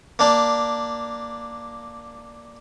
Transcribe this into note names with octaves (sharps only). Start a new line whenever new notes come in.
A#3 D4